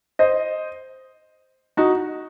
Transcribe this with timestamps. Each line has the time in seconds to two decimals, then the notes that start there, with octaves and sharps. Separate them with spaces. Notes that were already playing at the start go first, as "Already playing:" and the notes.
0.19 C5 D#5
1.77 D#4 F#4